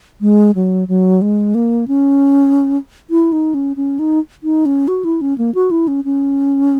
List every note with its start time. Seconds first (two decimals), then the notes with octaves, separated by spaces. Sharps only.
0.21 G#3
0.55 F#3
0.88 F#3
1.22 G#3
1.55 A#3
1.88 C#4
3.10 E4
3.32 D#4
3.54 C#4
3.77 C#4
3.99 D#4
4.43 D#4
4.66 C#4
4.88 F#4
5.04 E4
5.21 C#4
5.38 A#3
5.55 F#4
5.71 E4
5.88 C#4
6.05 C#4